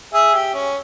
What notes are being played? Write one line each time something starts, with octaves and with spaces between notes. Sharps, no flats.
G#4 E5
G4
C#4